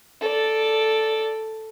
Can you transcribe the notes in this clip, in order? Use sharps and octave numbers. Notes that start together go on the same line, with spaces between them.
A4 D5